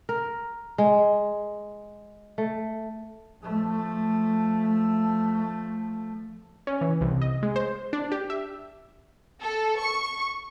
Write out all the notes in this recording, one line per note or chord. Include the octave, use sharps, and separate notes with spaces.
A#4
G#3
A3
F3 A3
C#4
E3
C2
D#5
G#3
C5
D4
G4
E5
A4
C#6